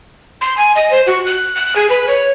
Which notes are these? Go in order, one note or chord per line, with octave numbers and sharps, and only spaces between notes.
C6
G#5
D#5
C5
F#4
F#6
F#6
G#4
B4
C#5